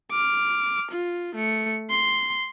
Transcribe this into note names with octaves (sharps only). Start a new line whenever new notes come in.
D6 F6
F4
A3 C#7
C6